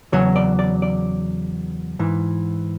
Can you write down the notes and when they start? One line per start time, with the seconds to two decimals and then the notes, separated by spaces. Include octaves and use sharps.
0.12 E2 C#3 F#3 C#5
0.36 D5
0.59 D5
0.82 D5
1.99 G#2 E3